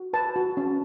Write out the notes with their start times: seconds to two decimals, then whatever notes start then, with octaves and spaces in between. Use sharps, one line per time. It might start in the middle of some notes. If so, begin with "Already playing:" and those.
Already playing: F#4
0.13 B4 A5
0.36 F#4
0.57 C#4